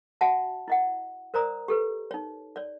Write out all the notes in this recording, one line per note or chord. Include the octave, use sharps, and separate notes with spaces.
F#4 C#5 E5 F#5 A5
E4 D#5 F#5
A#4 C5 D5 A#5 D#6
G4 A4 B4
D#4 C#5
C#5 D5